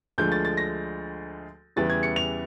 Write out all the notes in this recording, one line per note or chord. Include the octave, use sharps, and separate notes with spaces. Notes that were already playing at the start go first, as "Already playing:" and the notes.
D2 D3 F3 G#3 G6
A6
A6
A#6
E2 C#3 E3 G3 A6
G#6
C#7
F7